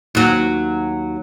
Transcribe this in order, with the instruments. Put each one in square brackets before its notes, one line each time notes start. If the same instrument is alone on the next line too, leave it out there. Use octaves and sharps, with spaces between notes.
[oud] D#2 F#3